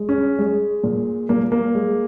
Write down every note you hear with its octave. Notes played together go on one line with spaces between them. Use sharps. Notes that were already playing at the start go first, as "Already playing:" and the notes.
Already playing: G#3
C#4
G#3
A#2
A#2 A#3
A#3
G#3